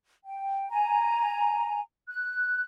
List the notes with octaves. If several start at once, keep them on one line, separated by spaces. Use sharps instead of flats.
G5
G#5 A#5
F#6